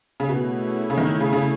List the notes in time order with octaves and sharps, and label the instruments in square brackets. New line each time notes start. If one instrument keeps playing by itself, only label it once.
[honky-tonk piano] C#3
[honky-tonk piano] B2 [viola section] A3 C#4 E4 G#4
[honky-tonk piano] C#3
D#3
C#3
C#3